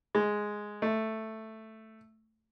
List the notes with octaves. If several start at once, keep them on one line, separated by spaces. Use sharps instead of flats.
G#3
A3